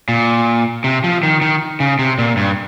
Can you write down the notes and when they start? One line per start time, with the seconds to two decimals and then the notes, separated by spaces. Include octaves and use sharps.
0.09 A#2
0.84 C3
1.04 F3
1.23 D#3
1.41 D#3
1.80 C#3
1.99 C3
2.19 A#2
2.37 G2